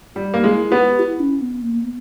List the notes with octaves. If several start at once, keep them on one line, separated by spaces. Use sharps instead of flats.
G3 G4
A#3
G#3 E4
B3 G4
E4
C#4
B3
A#3
B3